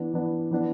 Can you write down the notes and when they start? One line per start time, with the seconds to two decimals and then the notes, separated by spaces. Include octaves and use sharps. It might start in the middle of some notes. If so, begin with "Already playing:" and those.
Already playing: E3 B3 D4
0.13 E3 B3 D4
0.51 E3 B3 D4